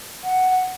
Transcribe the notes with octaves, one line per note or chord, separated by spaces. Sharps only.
F#5